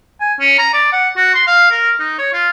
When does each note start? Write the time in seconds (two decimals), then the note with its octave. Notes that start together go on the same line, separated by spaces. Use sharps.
0.20 G#5
0.39 C#4
0.59 A#5
0.73 D5
0.92 F#5
1.16 F#4
1.34 C6
1.47 F5
1.71 A#4
1.99 D#4
2.18 C#5
2.33 F4